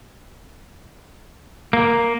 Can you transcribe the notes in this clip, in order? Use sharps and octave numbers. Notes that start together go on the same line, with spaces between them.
A#3